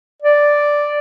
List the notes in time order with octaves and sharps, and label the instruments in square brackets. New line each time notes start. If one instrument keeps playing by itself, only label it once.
[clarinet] D5